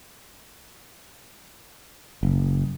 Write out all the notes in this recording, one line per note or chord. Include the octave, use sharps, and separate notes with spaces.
F#1